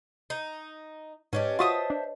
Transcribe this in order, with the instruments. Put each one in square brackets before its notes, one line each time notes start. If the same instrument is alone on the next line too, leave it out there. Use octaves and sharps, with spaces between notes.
[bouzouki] D#4
[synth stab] G#2 [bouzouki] C#4 D4 G4 [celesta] B4 C#5 D#5
[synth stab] F4 F#4 D#6 [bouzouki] C5 E5 A5
[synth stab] D4